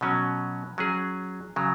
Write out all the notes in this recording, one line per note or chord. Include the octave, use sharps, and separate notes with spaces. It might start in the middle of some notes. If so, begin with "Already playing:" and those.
B2 F#3 C#4
F#3 C#4 G#4
C#3 F#3